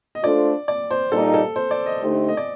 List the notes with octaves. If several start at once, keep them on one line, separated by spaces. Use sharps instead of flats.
D#5
A3 D4 F4 A4 C5 D5
D5
C5
A#2 G3 A#3 D#4 A4
A4
C5
D5
D#5
D3 A3 D#4 G4 C5
D#5
D5